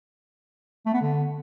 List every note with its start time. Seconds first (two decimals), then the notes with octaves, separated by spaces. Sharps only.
0.86 A3
0.94 B3
1.01 D3